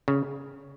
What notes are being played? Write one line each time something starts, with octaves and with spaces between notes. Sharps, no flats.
C#3